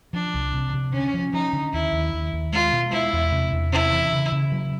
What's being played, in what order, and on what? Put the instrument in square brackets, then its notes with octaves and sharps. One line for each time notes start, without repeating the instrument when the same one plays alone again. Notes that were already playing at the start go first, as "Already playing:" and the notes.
[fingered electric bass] F3 [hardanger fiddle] D4
[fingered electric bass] C2
C3
C3
[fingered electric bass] D3 [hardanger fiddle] C#4
[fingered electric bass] F3
[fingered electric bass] F3 [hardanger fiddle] D#4
[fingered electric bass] D3
[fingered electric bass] D#2 [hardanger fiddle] E4
[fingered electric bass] D#2
D#2
D#2
[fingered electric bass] G#3 [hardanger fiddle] F4
[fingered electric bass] B2
[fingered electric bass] G#3 [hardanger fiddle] E4
[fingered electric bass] E2
C3
E2
[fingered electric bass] C3 [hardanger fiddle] E4
[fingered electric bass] E3
C#3
C#3
F#3